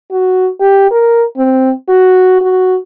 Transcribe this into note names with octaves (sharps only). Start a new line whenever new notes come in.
F#4
G4
A#4
C4
F#4
F#4